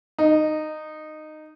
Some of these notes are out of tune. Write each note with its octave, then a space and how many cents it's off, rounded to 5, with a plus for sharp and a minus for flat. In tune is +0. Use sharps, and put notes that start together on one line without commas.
D#4 -15